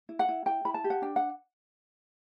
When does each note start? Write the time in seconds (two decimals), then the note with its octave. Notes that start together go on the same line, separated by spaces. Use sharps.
0.09 E4
0.19 F#5
0.29 E4
0.46 E4 G5
0.65 E4 B5
0.74 A5
0.84 G4
0.90 F#5
1.02 D4 G5
1.16 F#5